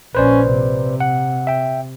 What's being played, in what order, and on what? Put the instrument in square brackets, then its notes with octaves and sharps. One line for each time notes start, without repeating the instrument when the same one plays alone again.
[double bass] A#1 C#4 [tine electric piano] B4 C5 D5
[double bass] C3
[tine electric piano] F#5
E5 G5